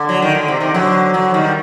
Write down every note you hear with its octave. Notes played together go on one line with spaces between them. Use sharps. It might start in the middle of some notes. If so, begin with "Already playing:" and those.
Already playing: D3
F#3
D#3
D3
C3
C3 D#3
D3 F#3
D3 F#3
D#3 G3